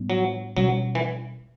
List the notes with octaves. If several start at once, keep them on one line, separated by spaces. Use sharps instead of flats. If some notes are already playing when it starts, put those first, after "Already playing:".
Already playing: A2 G3 B3 D4
F#3
B2 F#3 G3 C#4
E3